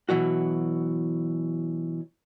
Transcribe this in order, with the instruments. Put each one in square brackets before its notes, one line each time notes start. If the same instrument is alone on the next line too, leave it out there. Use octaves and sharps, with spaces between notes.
[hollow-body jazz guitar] B2 E3 F#3 F#4